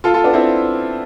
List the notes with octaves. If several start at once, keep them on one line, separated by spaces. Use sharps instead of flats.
F4 A4
F4 A4
B3 D4
C4 E4